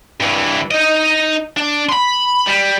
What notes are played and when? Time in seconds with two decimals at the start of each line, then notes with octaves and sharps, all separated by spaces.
0.20 G2 E3
0.71 D#4 D#5
1.57 D4
1.89 B5 C6
2.47 G3